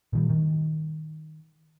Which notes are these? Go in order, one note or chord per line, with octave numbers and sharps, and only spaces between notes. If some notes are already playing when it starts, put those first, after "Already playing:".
A#2 D#3 G3
D#3